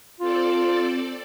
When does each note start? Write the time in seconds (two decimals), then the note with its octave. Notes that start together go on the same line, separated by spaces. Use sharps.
0.20 C4 F4 A4 D5